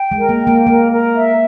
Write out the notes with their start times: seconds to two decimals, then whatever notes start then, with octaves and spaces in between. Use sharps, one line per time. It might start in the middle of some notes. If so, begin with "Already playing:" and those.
Already playing: G5
0.12 G#3
0.17 A#4
0.29 A#3
0.41 G5
0.47 A#3
0.67 A#3 A#4
0.91 A#4
1.15 E5